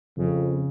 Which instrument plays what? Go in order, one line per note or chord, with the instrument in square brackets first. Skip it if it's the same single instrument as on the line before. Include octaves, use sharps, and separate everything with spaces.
[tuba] F2 [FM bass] C#3